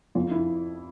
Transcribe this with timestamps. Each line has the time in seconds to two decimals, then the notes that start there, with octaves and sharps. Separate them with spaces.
0.15 F2 F4
0.31 E4